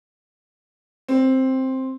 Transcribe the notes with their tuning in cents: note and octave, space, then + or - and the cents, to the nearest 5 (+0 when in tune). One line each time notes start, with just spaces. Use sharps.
C4 +5